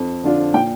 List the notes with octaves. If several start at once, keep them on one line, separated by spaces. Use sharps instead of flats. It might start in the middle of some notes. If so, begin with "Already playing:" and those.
Already playing: F2
D3 F3 D4 F4
A#2 G5